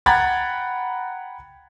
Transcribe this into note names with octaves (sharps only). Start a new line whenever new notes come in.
F#5 G5 A#5 B5 G#6 A6